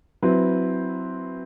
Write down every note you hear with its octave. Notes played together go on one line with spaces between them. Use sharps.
F#3 C4 E4 B4